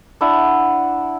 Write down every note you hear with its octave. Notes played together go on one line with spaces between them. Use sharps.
D4 E4 F#5